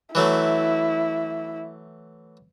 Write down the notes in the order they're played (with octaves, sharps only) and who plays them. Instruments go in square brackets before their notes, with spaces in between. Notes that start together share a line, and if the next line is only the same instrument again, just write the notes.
[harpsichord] E3 F#3 A3 [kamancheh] E4